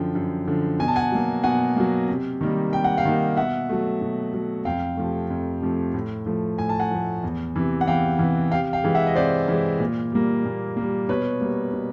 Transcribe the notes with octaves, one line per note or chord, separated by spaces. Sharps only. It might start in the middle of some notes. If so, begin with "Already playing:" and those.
Already playing: F#2 D3 F3 G5
F#2
D3 F3
B2 G#5
A5
F#5 G#5
F#3 A#3
B2 F#5 G#5
F#3 A#3
C3
D#3 G3 A#3
C3 G5
F#5
F5 G5
D#3 G3 A#3
B2 E5 F#5
F#3 A3
B2
F#3 A3
F2 F5 G5
C3 F3 A3
F2
C3 F3 A3
A2
F3 A3
A2 G#5
A5
F#5 G#5
F3 A3
E2
C3 E3
F#5
E2 F5 G5
C3 E3
C3 F5 G5
F5 G5
E3 G#3
E5 F#5
D#5
C3 C5 D5
E3 G#3
A#2
G3 A#3
A#2
G3 A#3
B2 B4 C#5
G3 A#3
B2